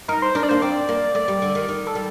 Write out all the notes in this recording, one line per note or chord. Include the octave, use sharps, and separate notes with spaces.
D#4 A#4
C5
D4 A#4
D5
A#3 C5
C4 D5
A#3
A3 D5
G3
D3
D#3
D#3
A4
G3